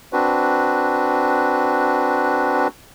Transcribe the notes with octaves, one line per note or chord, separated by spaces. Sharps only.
C4 D4 F#4 B4